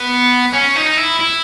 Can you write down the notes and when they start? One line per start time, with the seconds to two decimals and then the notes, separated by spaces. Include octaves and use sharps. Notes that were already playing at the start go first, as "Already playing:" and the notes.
Already playing: B3
0.53 C#4
0.76 D#4
0.98 E4
1.20 E4